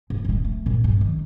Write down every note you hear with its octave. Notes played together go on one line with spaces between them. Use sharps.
A2
D#1 G#3
A3
F#2 A#2
G2
D#3